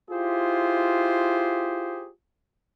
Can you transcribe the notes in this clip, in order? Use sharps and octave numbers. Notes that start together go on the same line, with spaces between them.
E4 F4 G4 G#4 C5